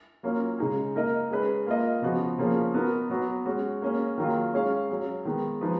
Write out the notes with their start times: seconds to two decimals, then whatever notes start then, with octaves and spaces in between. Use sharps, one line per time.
0.23 F#3 A#3 C#4 F4
0.58 C#3 G#3 D#4 G#4
0.95 A#3 D#4 A#4 D#5
1.30 G#3 C#4 G#4 B4
1.66 A#3 F4 A#4 D#5
2.02 C#3 F3 B3 F#4
2.38 C#3 F3 A#3 C#4 G#4
2.74 B3 D#4 F#4 A#4
3.10 F#3 B3 F#4
3.46 G#3 C#4 F#4
3.82 A#3 C#4 G#4
4.18 D#3 F#3 A#3 F4 G#4
4.53 G#3 C#4 G#4 C#5 F5
4.90 F#3 C#4 G#4
5.25 D#3 G#3 B3
5.61 F3 G#3 D#4 G#4 B4